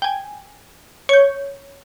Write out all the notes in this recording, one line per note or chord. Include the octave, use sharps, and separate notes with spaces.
G5 G#5
C#5 G6